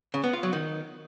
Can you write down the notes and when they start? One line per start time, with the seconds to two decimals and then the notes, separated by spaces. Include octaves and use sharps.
0.14 C#3
0.24 B3
0.33 F4
0.43 F#3
0.53 D#3